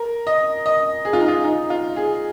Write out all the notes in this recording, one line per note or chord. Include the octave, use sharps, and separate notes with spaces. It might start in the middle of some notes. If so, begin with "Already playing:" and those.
Already playing: A#4
D#5
D#5
G#4
F4
D#4
F4
D#4
F4
G#4